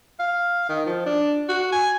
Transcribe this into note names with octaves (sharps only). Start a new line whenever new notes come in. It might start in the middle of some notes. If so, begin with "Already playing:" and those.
F5
D#3
F3
D4
F#4
G#5